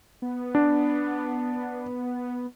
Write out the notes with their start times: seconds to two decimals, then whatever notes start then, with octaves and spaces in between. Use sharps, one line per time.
0.22 B3
0.55 D4